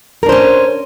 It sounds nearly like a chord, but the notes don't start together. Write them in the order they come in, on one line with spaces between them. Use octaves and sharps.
A#4 D4 C5 C#4